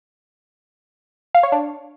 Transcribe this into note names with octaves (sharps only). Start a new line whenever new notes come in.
F5
C#5
D4